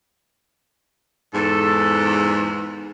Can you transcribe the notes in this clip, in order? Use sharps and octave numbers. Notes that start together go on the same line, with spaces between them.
E2 G#2 A4